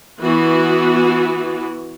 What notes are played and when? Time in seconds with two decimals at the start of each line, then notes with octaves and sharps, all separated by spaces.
0.21 E3 B3 F#4